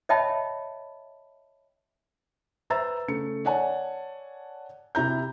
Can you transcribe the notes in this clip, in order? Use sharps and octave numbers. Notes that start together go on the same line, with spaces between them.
C#5 D#5 E5 G5 A5 B5
B4 C5 E5 A#5 E6 A6
C#3 A3 C#7
C#5 D5 F#5 G#5 A5
C3 E4 A#5 G6